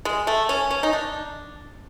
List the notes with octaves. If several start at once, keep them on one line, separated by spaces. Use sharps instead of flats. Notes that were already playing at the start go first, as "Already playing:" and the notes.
G#3
A3
C#4
C#4
D#4
D4